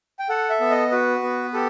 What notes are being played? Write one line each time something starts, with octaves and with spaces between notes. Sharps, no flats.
G5
A4 F#5
E5
B3
D#5
F#4 B4
B3
G4 A4